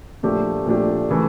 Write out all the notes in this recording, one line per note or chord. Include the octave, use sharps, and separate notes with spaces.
A#2 F3 A3 D4 G4
A#2 F3 A3 D4 G4
C#3 E3 A3